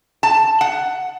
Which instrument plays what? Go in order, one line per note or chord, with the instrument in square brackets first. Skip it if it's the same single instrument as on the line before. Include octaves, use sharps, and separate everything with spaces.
[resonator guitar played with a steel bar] A5
F#5